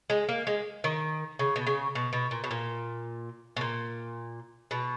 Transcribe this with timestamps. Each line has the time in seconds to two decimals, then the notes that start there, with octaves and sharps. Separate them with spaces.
0.10 G#3
0.29 A#3
0.47 G#3
0.84 D#3
1.39 C#3
1.56 B2
1.67 C#3
1.95 B2
2.13 B2
2.31 A#2
2.44 B2
2.51 A#2
3.57 B2
3.61 A#2
4.71 B2